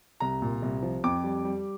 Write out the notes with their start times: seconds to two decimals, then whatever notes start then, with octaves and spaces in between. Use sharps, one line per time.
0.20 C2 A#5
0.42 A#2
0.62 C2
0.82 F3
1.04 F2 D6
1.24 G3
1.45 G3